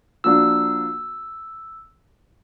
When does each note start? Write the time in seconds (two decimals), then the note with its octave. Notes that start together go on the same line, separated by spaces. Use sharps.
0.24 F3 A#3 D4 F#4 E6